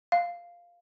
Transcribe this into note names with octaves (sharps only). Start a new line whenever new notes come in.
F5